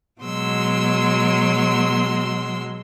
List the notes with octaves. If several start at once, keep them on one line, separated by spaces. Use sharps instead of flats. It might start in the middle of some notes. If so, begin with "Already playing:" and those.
B2 F#3 G#3 C6 E6